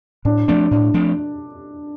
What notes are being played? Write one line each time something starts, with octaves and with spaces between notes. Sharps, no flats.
A2 D4
F3 A3 C4 D4
A2 D4
F3 A3 C4